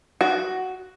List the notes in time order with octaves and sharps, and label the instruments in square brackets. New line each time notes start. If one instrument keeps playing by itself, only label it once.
[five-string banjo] F#4